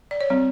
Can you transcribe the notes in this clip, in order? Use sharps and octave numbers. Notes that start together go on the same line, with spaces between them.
D5
C#5
G3 C4